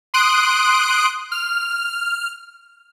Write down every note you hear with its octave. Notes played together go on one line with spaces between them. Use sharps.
C6 D#6 F#6 D7
F6